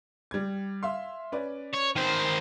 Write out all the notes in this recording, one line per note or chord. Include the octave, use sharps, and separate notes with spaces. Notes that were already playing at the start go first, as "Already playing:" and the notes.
G3 G#6
E5 F5 C6
C#4 B4 D5
C#5
D#3 C5